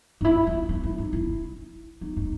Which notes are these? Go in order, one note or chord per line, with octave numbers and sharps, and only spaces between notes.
D#4
E4
E4
E4
E4
D#4
E4
D#4
D#4